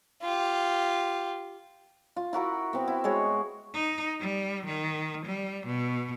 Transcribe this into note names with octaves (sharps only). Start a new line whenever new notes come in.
F4 G4
F4
E4 F#4 A#4 F#5
B3 C4
E4
G#3 F#4 C#5 D#5
D#4
G3
D#3
G3
B2